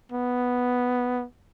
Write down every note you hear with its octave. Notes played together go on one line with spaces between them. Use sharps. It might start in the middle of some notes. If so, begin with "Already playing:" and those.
B3